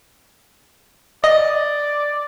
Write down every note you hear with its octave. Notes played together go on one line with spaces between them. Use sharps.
D5 D#5